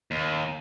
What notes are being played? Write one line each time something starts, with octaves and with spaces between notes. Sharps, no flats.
D#2